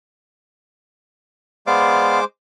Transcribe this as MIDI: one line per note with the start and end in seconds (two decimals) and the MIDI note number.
1.67 2.24 56
1.67 2.20 59
1.67 2.24 72
1.67 2.20 74
1.67 2.20 77
1.67 2.24 86